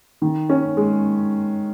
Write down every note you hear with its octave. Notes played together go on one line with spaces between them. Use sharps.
D#3
C#4
G#3